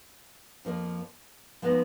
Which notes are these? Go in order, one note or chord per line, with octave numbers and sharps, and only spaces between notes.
F2 F3 A#3
F3 G#3 B3 D#4